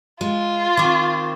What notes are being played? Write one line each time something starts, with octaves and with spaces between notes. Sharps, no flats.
G#3 F4
D#3 C4 C#6 D6